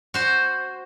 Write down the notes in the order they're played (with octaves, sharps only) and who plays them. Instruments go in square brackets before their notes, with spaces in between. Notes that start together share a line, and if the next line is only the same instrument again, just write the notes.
[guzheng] F#4 C5